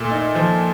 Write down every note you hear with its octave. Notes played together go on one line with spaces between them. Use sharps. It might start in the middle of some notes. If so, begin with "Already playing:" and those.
Already playing: A#2 A3
D#4
F3